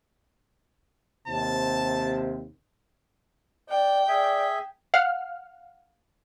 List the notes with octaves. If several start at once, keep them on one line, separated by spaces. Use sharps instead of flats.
D#2 C3 A5
D5 G5
G#4 D5 E5
F5 F#5 F6